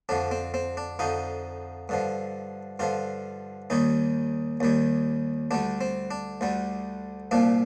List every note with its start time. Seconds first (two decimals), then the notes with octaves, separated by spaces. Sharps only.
0.09 F2 D3 F3 D4
0.31 C4
0.54 C4
0.77 D4
0.99 F2 D3 F3 D#4
1.89 G2 D3 F3
2.79 G2 D3 F3 F4
3.70 D#2 D#3 G3 D#4
4.60 D#2 D#3 G3
5.51 D2 D3 G3 D4
5.81 C4
6.11 D4
6.41 D2 D3 G3
7.31 C2 A#2 F3 D4